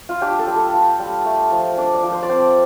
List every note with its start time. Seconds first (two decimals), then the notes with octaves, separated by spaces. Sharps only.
0.09 F4
0.22 D4 G4
0.39 A4
0.48 G3
0.56 A4
0.74 F4
1.00 G3
1.25 A3
1.51 F3
1.77 D4 D5
1.95 D5
2.03 F3
2.12 C5
2.23 D5
2.29 C4 C5